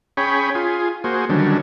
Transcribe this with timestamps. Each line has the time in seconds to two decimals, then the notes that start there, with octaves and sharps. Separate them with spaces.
0.17 C#4 G#4 C#5 G5 B5
0.55 F4 G#4
1.04 A#3 F#4 G#4 C5
1.29 D3 D#3 F#3 G3 C#4 D4